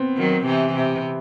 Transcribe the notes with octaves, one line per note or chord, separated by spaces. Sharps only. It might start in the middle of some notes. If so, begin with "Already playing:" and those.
Already playing: B3 C4
D#3 F#3
C3 E3
C3